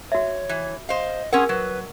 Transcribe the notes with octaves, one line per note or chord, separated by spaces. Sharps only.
F#4 C#5 E5
E3
C5 D#5 F5
C#4 G#4 A#4 F#5 C6
F#3 B4